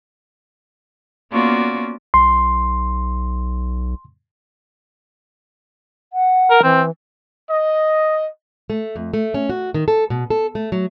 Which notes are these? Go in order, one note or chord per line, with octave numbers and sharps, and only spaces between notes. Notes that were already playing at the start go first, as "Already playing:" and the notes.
A#3 B3 C#4 F4 F#4 D5
B1 C6
F#5
A#4
E3 C4
D#5
A3
F2
A3
C#4
F#4
D#3
A4
B2
A4
A3
F#3